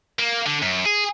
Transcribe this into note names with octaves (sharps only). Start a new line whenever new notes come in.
A#3
D3
F#2
G#4